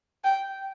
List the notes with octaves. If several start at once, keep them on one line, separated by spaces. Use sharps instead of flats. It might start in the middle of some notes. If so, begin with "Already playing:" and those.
G5